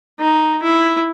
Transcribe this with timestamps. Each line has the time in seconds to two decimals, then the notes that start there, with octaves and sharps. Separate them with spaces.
0.19 D#4
0.62 E4